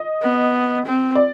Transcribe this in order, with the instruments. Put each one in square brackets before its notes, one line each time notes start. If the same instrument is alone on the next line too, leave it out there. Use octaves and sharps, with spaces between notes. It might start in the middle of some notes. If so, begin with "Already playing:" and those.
Already playing: [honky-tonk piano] D#5
[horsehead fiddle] B3
C4
[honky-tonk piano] D5